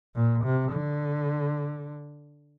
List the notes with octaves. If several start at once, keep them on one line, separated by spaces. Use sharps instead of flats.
A#2
C3
D3